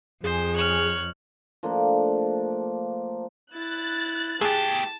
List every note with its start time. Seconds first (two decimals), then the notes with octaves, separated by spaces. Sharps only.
0.24 F2 G#4 C5
0.56 C#5 F6 F#6
1.63 F3 A3 A#3 D4
3.53 E4 F#6 A6
4.41 A3 G4 G#4 A5